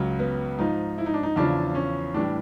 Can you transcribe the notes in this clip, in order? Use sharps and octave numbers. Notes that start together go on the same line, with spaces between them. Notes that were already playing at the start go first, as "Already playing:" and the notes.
Already playing: C#2 C#3 F#3
B3
G#2 F3 D#4
E4
D#4
D4
D#4
E2 C#3 F3 D4
C#4
A2 E3 G3 D4